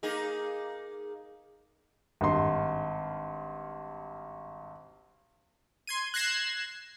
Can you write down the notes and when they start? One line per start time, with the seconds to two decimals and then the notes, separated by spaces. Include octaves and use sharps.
0.03 A#3 D#4 G#4
2.21 G#1 G2 C6
5.87 C6 G#6 D#7
6.14 F#6 G#6 A#6 C7 E7